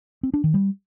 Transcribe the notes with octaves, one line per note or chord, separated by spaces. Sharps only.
C4
D4
D#3
G3